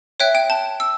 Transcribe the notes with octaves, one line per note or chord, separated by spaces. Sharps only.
C#5 E5 G5 F#6
G5
A5
E6